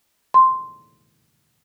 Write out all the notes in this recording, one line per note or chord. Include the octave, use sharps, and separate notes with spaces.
C6